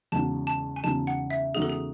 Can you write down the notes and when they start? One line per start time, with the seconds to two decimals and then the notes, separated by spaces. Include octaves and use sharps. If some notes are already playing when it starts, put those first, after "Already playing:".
0.12 E2 C#3 G#3 D#4 F#4 A5
0.47 A5
0.76 G#5
0.83 E2 C#3 G#3 D#4 F#4 A5
1.07 F#5
1.30 E5
1.55 E2 C#3 G#3 D#4 F#4 G#4
1.62 A4
1.69 G#4